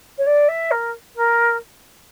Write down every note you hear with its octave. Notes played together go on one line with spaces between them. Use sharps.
C#5
D5
E5
A#4
A#4